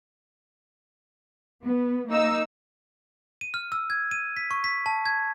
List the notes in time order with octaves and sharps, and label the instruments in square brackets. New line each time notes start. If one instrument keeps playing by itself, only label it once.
[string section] B3
A#3 D#4 E6
[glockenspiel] D#7
F6
E6
G#6
D#7
B6
C#6
B6
A5
G#6